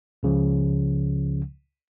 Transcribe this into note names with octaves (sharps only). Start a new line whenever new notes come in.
C#2 C#3 F3